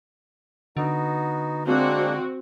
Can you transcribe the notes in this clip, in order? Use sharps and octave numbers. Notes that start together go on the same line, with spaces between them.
D3 B3 D#4 F#4
G#3 A#3 C4 D4 F#4